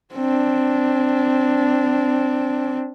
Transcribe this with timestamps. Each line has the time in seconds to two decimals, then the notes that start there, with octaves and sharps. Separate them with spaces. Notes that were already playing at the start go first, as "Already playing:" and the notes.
0.15 C4 D4